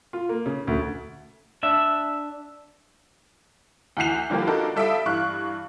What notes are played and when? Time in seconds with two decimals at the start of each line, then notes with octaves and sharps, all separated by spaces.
0.13 F4
0.29 A#3
0.46 C#3
0.67 D2
1.63 D4 E5
3.97 D2 E3 F#5 G6 C7 F7
4.30 D3 F3 G3 A#3 G4
4.47 D4 D#4 F4 F#4 A4 A#4
4.76 G3 A4 E5 F5 D#6 D7
5.06 G2 E3 F5 C#6 F6 F#6